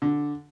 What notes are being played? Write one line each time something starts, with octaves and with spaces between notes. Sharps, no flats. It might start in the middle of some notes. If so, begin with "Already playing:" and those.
D3